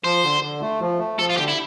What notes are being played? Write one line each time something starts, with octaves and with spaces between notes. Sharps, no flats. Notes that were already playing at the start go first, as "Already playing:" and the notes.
F3 C5
D3
D3
A3
F3
A3
F3 A4
F4
D3 G4
E4